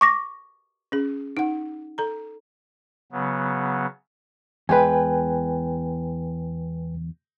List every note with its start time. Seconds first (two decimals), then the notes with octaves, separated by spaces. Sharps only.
0.01 C#6 D6 A#6
0.92 C#4 G#4
1.37 D#4 F#5
1.98 A4 A#5
3.12 C#3 F#3 B3
4.69 E2 G#3 B4 G5 G#5